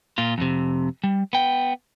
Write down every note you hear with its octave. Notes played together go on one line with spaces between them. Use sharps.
A#2 F4
F2 C3
G3
B3 G5